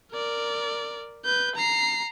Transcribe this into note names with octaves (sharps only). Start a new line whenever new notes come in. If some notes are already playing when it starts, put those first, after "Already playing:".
A#4 D5
B4 G6
A#5 C7